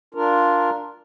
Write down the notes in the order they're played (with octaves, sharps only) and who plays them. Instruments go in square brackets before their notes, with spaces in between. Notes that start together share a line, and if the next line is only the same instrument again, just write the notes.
[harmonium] D4 F4 A#4